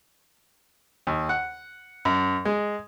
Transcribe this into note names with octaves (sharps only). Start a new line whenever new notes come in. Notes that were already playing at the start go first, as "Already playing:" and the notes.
D#2
F#5
F#2
G#3